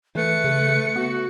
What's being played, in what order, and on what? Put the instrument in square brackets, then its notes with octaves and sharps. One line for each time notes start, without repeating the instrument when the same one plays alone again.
[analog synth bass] E3 [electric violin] A3 C#7 [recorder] B4
[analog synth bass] C#3
[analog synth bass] B3 [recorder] F#4